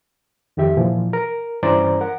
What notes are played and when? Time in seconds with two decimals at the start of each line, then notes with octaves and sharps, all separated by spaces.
0.57 F2 D#3 G4 E5
0.77 A#2 E3 F3
1.13 A#4
1.63 G2 E3 C#4 C5 D5 A#5
2.01 A#4 F#5